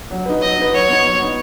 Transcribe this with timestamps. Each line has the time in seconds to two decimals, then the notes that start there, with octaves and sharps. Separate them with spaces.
0.11 F#3
0.26 D#4 B4
0.41 F#3 D#5
0.57 D#4 B4
0.73 F#3 C#5
0.88 B3 D#4
1.04 F#3
1.20 B3 D#4